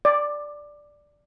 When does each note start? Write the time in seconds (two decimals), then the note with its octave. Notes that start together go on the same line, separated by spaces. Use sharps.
0.05 D5